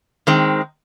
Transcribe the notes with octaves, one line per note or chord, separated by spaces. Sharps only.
D#3 G#3 C4